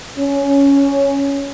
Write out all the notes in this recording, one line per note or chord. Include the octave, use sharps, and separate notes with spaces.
C#4